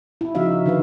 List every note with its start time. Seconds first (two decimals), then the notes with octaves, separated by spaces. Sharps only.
0.21 E4
0.35 C#3 F3 D#4 F#4 E5 F5
0.66 D3 D#3 D#4 B4 F5